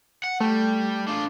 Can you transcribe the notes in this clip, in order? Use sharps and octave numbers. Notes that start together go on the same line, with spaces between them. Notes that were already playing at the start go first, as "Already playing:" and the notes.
F#5
G3 A3
D4 F4